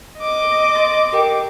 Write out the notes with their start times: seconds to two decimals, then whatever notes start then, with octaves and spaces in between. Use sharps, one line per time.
0.19 D#5 D6
0.75 C6 A6
1.12 G4 A#4 G5